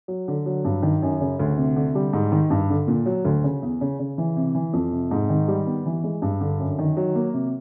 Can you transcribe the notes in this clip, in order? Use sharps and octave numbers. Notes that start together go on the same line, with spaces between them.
F#3
D3
F#3
G2
D#3
F#2
C#3
D2
C3
D3
G3
G#2
D#3
G2
D3
A#2
F#3
D2
C#3
E2
C#3
C#3
E3
C3
E3
F2
C3
G#2
D#3
G3
B3
E3
G#3
G2
D3
F#2
D#3
F#3
A#3
C3